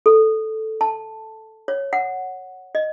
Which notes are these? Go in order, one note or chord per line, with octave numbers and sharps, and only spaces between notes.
A4
A5
C#5
F#5
D#5